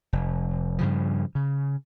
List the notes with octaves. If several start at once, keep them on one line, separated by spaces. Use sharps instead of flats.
F1
G2 C#3 F3
C#3